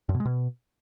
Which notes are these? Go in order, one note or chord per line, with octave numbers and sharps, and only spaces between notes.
F#2
B2
G#3
B2